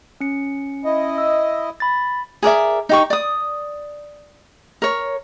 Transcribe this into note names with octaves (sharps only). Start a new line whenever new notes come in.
C#4 C#7
E4 D#5
E6
B5 A6
G#4 A#4 D5 E5
D#4 G4 C#6
D5 D#6
A#4 C#5